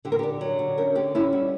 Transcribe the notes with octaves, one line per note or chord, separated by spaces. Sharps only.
D3 G4
A#4
D3 G4
F#3
D3
C#4 A#4
D3 G4
C#4 E4
G3 F#4